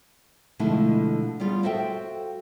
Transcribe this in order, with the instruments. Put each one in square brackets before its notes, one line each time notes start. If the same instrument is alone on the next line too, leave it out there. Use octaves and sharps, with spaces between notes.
[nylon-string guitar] B2 D3 F3 G#3 A3 E4
G3 B3 F4 G#4
F#4 A4 C5 E5 F5 G5